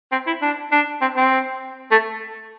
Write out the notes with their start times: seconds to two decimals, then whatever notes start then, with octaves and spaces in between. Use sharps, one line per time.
0.12 C4
0.27 E4
0.42 D4
0.72 D4
1.01 C4
1.17 C4
1.92 A3